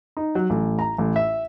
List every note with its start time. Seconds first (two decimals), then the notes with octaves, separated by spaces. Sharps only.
0.17 D#4
0.35 F#3
0.50 A1
0.79 A#5
0.98 A1
1.16 E5